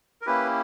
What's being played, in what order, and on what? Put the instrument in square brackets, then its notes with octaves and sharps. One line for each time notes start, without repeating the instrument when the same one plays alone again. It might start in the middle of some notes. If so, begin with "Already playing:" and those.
[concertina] A#4
A#3 C#4 E4 G4 B4